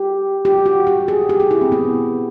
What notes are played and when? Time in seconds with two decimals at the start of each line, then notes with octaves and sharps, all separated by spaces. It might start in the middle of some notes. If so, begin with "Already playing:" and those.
Already playing: G4
0.45 G4
0.66 F#4
0.87 G4
1.08 G#4
1.29 G4
1.40 G#4
1.51 E4
1.61 C4
1.72 B3